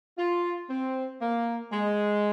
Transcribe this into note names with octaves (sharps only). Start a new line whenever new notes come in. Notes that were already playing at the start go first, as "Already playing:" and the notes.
F4
C4
A#3
G#3